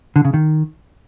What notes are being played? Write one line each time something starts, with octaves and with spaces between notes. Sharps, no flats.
D3
C#3
D#3